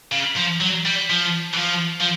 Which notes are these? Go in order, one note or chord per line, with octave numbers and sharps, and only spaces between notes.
C#3
F3
F#3
G3
F3
E3
F3
F3